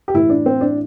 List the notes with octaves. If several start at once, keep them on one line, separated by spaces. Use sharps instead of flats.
G4
A2 E3 E4
D4
C4
D4